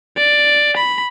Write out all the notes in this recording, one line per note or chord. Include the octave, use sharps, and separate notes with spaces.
D5
B5